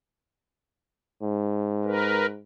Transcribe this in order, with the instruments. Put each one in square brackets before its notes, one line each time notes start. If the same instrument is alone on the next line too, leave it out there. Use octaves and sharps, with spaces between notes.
[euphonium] G#2
[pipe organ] A#4 B4